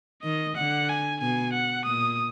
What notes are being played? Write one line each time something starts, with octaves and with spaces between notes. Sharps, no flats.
D#3 D#5
D3 F#5
G#5
B2 G#5
F#5
A#2 D#6